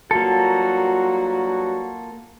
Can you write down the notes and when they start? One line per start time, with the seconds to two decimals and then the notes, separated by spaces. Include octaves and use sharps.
0.11 G2 F#3 A#3 F4 F#4 A4